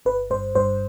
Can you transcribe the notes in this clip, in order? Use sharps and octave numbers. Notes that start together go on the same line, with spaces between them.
G1 B4
G2 C5
G2 C5